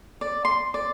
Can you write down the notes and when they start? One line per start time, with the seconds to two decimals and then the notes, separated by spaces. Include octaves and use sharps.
0.21 D5
0.45 C6
0.74 D5